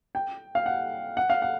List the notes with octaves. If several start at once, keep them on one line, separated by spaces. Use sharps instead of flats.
G5
F5
F#5
F#5
F5
F#5